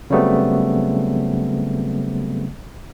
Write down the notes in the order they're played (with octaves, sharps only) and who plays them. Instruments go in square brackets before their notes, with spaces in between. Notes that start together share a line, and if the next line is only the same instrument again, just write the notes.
[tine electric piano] C#3 F#3 G3 A3 B3 C4